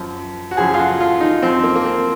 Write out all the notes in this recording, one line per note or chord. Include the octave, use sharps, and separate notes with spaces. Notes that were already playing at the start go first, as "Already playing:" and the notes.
Already playing: F#2 F3
F#4
F#2 C#3 F3 G#4
F4
F#4
F4
D#4
F#2 F3 C4
A#3
A#3
C4